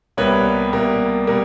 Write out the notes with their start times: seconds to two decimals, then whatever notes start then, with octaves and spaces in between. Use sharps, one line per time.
0.17 C2 B2 G3 A#3 B4 C#5
0.72 C2 B2 G3 A#3
1.27 B2 G3 A#3